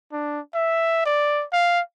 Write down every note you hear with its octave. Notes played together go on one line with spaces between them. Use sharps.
D4
E5
D5
F5